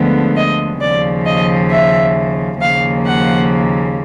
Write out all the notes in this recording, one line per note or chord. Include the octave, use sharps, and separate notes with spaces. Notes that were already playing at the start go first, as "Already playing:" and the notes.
Already playing: D2 D3 F3 G#3 B3
D#5
D#2 C#3 F3 D5
D#5
E5
D#2 C#3 F3 A#3 F5
F#5